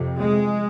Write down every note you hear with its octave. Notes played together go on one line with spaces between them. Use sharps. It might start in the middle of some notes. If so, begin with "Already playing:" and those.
Already playing: F2 C3
G#3